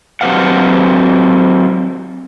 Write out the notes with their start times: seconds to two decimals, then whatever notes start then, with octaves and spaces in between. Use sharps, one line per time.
0.21 F#3 C4 G4 B4 F5 F#5